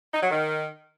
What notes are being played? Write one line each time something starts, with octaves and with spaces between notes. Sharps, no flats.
D#4
F#3
D#3